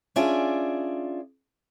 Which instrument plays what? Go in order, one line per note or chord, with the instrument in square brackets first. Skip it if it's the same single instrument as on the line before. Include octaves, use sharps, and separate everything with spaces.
[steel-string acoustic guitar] C#4 D4 F4 G#4 D5 E5